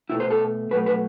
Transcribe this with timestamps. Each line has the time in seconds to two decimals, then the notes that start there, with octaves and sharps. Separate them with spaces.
0.10 B2 A3 E4
0.20 C5
0.30 A4
0.71 B2 F#3 A3 B4
0.86 B4